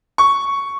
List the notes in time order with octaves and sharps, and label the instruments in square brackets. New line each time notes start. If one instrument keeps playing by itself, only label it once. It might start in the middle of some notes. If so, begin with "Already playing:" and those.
[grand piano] C#6